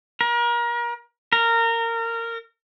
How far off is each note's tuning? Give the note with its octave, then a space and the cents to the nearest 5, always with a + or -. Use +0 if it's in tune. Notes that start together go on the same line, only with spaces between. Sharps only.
A#4 +35
A#4 -20